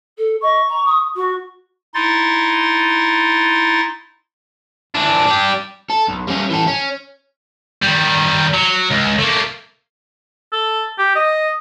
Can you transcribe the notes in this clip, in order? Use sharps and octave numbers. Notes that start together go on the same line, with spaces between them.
A4
D#5 C#6
A#5
D#6
F#4 C#6
D#4 E4 C6 A6
E3 D4
D4 G4
A4
B1
G3 C#4
E3 A4
C#4
D#3 G3
F#3
C#2
A3 A#3
A4
G4
D#5